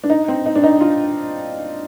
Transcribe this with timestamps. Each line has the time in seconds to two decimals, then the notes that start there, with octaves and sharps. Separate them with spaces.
0.04 D4
0.10 D#4
0.28 C4
0.46 D#4
0.55 D4
0.64 D#4
0.81 F4